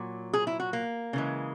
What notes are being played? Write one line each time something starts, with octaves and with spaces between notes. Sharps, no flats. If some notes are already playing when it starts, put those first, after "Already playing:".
Already playing: A#2 F#3
G#4
E4
F#4
A#3
C#3 E3 G#3